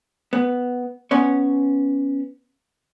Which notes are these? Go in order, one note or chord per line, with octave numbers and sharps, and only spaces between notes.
B3
B3 C#4 C#5